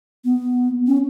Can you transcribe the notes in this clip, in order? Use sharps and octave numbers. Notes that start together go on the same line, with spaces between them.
B3
C#4